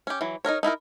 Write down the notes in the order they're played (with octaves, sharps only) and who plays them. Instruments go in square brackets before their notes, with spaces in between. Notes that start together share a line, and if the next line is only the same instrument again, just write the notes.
[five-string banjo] C#4 G4
E3 F#3
D#4 F4 A#4 C#5
D#4 E4 F#4 A#4